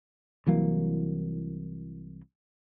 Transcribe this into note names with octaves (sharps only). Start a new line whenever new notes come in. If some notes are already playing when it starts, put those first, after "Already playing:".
C2 E3 F#3 A#3